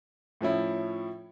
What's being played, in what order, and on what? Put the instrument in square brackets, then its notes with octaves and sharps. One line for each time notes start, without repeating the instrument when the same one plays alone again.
[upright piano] A2 F3 C#4 E4